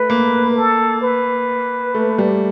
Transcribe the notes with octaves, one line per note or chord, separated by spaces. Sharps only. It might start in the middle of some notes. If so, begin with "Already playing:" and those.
Already playing: A3 B4
A#3
A4
B4
A3
G3